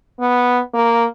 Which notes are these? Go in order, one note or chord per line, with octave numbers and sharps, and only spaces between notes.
B3
A#3